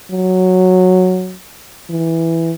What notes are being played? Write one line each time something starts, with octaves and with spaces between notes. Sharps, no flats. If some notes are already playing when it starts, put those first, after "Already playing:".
F#3
E3